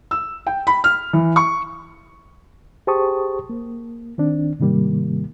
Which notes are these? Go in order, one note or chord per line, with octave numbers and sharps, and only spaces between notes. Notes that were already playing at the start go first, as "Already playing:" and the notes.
E6
G5
B5
F6
E3
C#6
G4 G#4 C5 A5 C#6 D#6
A#3
D#3 C4 D4
G#2 C3 D#3 G3 A#3